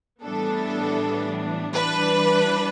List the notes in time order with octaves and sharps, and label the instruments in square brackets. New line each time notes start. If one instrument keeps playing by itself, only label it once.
[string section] A2 E3 G3 B3 D4 A4
E3 G3 D4 B4